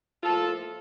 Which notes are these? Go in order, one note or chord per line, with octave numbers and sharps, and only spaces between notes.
A2 F3 A#3 F4 A4